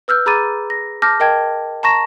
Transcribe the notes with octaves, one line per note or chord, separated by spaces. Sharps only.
B4 E6 F6 G6
G#4 A#5 B5 D6 A6 D#7
A#6
A5 D6 F6 G6 A#6
A#4 D#5 G5 A5 G#6
A5 A#5 C#6 A#6 E7